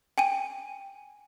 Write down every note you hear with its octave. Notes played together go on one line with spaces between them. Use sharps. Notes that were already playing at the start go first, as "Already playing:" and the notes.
G5 G#5 D#7